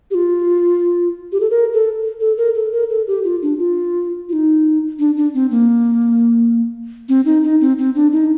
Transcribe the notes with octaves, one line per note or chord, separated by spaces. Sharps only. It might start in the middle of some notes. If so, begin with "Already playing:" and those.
G4
F4
G4
A4
A#4
A4
A4
A#4
A4
A#4
A4
G4
F4
D4
F4
F4
D#4
D4
D4
C4
A#3
C4
D#4
D#4
C4
C4
D4
D#4